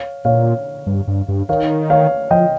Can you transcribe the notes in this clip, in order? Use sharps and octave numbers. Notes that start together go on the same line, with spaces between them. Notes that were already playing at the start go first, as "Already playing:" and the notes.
Already playing: C#5 F5
A#2 C#5 F5
G2
G2
G2
D#3 C#5 F5
C#5 F5
F3 D#5 G5